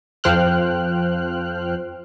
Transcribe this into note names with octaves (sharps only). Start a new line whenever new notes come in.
F2 F3 C5 G5 F6 F#6